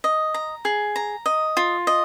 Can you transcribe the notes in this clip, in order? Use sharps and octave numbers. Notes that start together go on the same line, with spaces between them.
D#5
A#5
G#4
A#5
D#5
F4
D#5